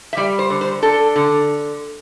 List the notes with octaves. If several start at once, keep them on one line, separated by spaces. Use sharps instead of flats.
E5
G3 D5
C5
D3
C5
D4 A4
D3